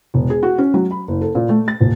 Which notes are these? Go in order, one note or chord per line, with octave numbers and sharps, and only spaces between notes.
E1
G#4
F#4
C#4
F#3
B5
F#1
A4
A#2
A3
A6
D#1